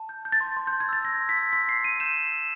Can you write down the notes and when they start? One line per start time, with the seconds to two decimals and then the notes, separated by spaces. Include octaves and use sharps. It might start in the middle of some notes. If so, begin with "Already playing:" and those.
Already playing: A5
0.09 G6
0.25 G6
0.32 A6
0.41 C6
0.57 C6
0.67 G6
0.73 C6
0.80 G#6
0.89 E6 A6
1.05 G6 A#6
1.21 C6
1.29 B6
1.37 E6
1.53 C6 B6
1.68 C6 C7
1.84 E6 D#7
2.00 G6 E7
2.16 C6
2.32 E6